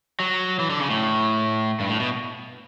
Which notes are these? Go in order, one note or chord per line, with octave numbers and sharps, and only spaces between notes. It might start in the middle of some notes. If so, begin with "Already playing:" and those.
F#3
E3
D3
C#3
A2
G2
A2
B2